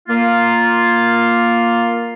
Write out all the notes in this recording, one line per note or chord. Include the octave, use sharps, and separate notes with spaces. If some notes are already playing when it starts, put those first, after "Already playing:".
A#3 F4